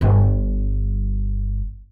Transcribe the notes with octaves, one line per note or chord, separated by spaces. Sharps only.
G1 G2